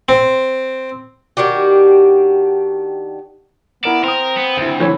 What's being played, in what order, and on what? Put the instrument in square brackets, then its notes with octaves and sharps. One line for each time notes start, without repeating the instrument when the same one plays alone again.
[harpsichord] C4
[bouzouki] D#3 D4 F#4 G4
[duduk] B3 [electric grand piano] E4 A#4 E7 [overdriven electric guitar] D5
[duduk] C4 [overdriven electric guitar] A#4 [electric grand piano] C6 D#6
[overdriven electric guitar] B3
[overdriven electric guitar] D2 [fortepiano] E4 G5
[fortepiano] D3 E3 C#5